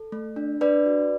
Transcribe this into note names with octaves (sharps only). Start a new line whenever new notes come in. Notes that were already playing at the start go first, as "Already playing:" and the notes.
Already playing: A4
A3
D4
D4 B4 D5
F#4